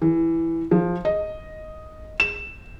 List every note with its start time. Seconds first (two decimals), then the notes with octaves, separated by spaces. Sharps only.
0.02 E3
0.71 F3
1.05 D#5
2.20 E7